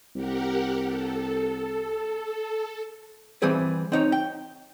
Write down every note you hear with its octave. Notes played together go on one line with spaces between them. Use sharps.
C2 G4 A#4 F#5
A4
E3 G3 C4 G#4 B4
C4 D#4 C#5
G5